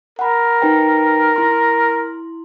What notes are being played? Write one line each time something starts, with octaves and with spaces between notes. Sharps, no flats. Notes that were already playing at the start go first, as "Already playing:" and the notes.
A#4 F#5 B5
D#4 B4 G5
E4 C6